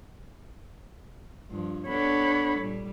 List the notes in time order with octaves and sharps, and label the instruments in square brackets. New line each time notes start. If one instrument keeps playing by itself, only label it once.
[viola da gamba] G2 F3
[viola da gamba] B3 D4 A4 [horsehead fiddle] C#5 B5
[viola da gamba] A#2 G3